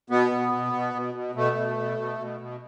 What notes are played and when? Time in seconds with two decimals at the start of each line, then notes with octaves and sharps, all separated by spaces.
0.10 B2 B3
0.31 B2
0.52 B2
0.73 B2
0.94 B2
1.14 B2
1.35 B2 A3
1.56 B2
1.77 B2
1.98 B2
2.18 B2
2.40 B2